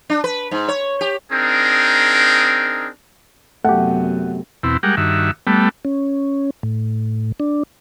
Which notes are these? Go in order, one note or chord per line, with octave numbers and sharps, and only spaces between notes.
D4
B4
G#2
C#5
G4
C4 D4 D#4 G#4 A#4
F#2 C3 A3 B3 G4 F#5
E2 B2 C4 E4
G3 G#3 G4 A#4 F#5
G2 D#3 F#4 E5
G3 A3 B3
C#4
A2
D4